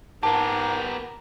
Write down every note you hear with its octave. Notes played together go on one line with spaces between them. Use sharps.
G#2 B3 G4 A#4 A5